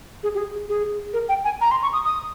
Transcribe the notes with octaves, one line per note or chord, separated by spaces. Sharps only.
G#4
G4
G#4
G#4
A#4
G5
G#5
A#5
C6
C#6
D#6
D#6